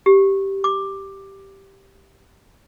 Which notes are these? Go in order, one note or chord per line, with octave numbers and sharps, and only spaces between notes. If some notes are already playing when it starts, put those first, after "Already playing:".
G4
D6